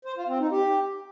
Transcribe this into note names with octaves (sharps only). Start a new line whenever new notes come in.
C5
F4
C4
D#4
G4